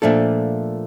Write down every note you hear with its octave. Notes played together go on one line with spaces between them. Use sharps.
A#2 F3 A3 D4 A4